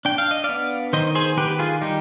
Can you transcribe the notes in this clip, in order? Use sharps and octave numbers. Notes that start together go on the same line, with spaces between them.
D4 G5
F5
D#5
B3 D5 F5
D#3 C5 D#5
G#4 C5
D#3 G4 B4
B4
F4 G#4
G3 D#4 G4